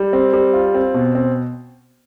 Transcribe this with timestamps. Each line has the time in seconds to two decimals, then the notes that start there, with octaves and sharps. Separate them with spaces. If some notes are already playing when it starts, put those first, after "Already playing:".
Already playing: G3
0.13 C4
0.33 G3
0.54 F4
0.74 C4
0.94 B2
1.15 C4